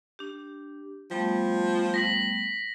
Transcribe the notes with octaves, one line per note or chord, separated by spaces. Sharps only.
D4 G4
F3 G3 A3 B3
A#6 B6 F#7